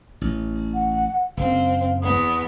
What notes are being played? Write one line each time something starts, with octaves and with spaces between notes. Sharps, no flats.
A1
F#5
F#1 C4 F5
E2 B3 D#6